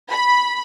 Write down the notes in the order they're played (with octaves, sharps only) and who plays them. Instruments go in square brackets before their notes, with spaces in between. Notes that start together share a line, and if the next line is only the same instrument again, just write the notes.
[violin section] B5